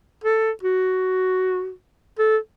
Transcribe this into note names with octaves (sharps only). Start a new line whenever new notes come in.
A4
F#4
A4